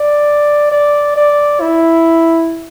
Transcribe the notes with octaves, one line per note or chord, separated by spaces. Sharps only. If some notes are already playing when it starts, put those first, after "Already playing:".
Already playing: D5
D5
D5
E4